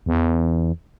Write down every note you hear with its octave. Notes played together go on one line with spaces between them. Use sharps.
E2